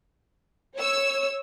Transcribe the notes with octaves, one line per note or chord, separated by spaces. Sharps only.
C#5 E6